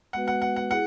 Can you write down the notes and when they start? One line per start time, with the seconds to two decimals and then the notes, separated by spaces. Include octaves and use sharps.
0.13 G#3 B3 F#4 B4 F#5
0.28 F#5
0.42 F#5
0.56 F#5
0.70 E4 G#4 F#5